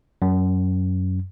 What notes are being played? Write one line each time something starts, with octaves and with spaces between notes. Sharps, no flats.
F#2